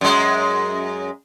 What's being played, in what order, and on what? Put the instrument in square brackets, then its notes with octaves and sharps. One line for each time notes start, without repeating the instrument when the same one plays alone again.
[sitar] F#2 G#3